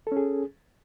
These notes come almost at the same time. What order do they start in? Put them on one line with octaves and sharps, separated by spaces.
A4 C#4 G#4